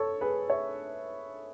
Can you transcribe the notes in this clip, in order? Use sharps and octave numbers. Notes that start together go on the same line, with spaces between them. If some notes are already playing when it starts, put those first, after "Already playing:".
Already playing: A4 C#5
G#4 B4
C#5 E5